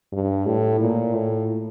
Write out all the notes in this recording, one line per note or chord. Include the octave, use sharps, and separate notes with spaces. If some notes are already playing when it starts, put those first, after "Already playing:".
G2
A2
A#2
A2